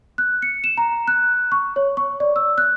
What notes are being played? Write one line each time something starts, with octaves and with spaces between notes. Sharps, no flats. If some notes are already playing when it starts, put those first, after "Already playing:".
F#6
C#7
E7
A#5
F#6
C#6
C#5
C#6
D5
E6
F#6